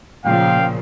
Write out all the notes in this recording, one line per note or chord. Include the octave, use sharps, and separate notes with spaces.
A#2 C#3 F3 F5 G5